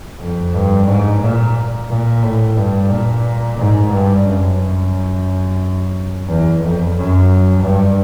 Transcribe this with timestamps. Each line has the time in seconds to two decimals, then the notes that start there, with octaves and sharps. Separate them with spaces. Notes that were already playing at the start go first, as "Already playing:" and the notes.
0.20 F2
0.53 G2
0.88 G#2
1.21 A#2
1.89 A#2
2.23 A2
2.56 G2
2.90 A#2
3.58 G#2
3.91 G2
4.26 F#2
4.59 F#2
6.27 E2
6.62 F2
6.96 F#2
7.63 G2